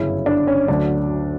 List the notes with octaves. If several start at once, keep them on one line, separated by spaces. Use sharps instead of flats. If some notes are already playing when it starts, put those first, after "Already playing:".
Already playing: G1 F#2 C#3 C#4 E4
D4
C#4
D2 D3 F#3 D4